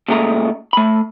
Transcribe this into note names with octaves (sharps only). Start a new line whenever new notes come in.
A#2 C#3 G#3 A3 A#5
A3 B5